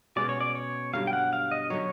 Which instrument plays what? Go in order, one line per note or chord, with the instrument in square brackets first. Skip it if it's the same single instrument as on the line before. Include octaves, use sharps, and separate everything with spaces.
[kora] B2 G#3 C#4 F#4 [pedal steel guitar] D5
[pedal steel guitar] C#5
D5
C#5
[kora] G2 D3 F#3 [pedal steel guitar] F5
[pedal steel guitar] G5
F#5
F5
D#5
[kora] D3 F#3 [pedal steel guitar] C#5